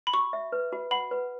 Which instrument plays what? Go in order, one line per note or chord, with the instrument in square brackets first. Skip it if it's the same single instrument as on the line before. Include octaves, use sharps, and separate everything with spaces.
[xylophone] B5
[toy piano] F#4 [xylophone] C#6
[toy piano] E5
B4
F#4
[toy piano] F#5 [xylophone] B5
[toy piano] B4